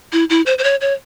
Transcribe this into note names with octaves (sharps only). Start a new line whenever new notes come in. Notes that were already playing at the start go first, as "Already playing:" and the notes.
E4
E4
C5
C5
C#5
C#5